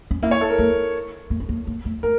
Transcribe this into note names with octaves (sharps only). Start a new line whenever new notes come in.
C#4
A#3 E4
C#5
A4
A#4
A#3
A#3
C#4
A#3
A#3
A3
A3 A#4